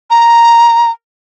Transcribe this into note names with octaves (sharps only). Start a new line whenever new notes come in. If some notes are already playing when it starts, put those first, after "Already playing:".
A#5